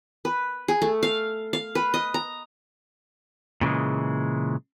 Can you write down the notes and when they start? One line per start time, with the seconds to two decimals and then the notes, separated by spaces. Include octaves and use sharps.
0.25 B4
0.68 G#4
0.82 A3
1.03 F5
1.53 F5
1.75 B4
1.94 D#5
2.14 A#5
3.61 A#2 C#3 E3 G#3